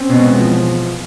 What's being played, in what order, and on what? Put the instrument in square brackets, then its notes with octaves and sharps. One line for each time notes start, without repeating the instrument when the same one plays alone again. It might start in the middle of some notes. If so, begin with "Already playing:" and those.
Already playing: [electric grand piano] C4 C#4
[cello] B2 [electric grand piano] B3
[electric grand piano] G#3
E3
F3